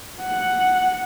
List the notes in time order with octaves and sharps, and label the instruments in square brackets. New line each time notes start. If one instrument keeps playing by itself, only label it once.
[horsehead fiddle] F#5